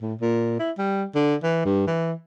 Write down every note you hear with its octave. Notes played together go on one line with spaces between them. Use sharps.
A2
A#2
E4
G3
D3
E3
G2
E3